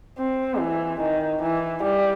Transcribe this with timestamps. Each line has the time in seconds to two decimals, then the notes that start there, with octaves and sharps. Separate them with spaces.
0.18 C4
0.59 E3
1.01 D#3
1.42 E3
1.83 G3